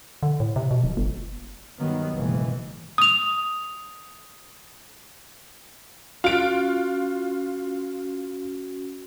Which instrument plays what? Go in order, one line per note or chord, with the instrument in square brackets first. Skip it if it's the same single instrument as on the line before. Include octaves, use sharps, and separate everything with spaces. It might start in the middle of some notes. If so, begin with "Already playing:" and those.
[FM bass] D3
A2
C3
B2
D1
G1
[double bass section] G2 D#3 F#3 B3
F#1 G#2 B2 E3
[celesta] D#6 F7
[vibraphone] C#4 F#4 [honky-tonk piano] F4 D7